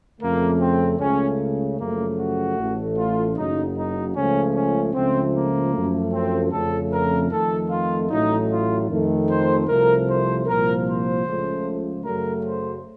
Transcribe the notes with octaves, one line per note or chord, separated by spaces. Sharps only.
F2 C#3 A3 A#3
C4
C#2 C#3 A3 C#4
F#2 C#3 F3 A3 A#3
F#4
A1 A2 A3
F4
F#1 F#2 C#3 F#3 D#4
D#4
C#2 C#3 F3 A3 C#4
C#4
C#2 C#3 F3 A3 C4
A#3
F#2 F3 A3
C4
F2 C#3 A3 A4
A#4
F2 D#3 A3 A4
F4
A1 A2 F#3 A3 D#4
F4
F2 D#3 A3
C5
C2 C3 F3 A3 A#4
C5
C2 A#2 F3 A#4
C5
C#2 C#3 F3 A3
F#2 C#3 F#3 A3 A#4
C5